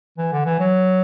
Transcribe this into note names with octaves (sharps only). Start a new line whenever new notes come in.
E3
D3
E3
F#3